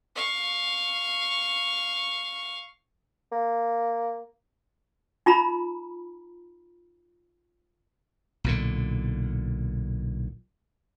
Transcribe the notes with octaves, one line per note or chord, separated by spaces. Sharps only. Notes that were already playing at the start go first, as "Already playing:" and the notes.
F5 C#6
A#3
D#4 F4 A#5 B5
B1 A#2 D3